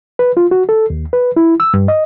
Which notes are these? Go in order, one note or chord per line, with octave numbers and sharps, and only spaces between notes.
B4
F4
F#4
A4
D#2
B4
E4
E6
G2
D#5